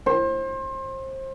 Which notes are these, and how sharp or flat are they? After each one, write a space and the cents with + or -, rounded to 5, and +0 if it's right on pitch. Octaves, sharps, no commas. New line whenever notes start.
C5 +30